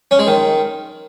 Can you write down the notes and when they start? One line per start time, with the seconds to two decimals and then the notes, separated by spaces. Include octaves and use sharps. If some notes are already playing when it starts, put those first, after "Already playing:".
0.11 C#4
0.19 G#3
0.27 D#3